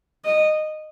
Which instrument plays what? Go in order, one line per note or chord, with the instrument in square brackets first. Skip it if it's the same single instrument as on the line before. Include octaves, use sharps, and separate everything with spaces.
[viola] D#5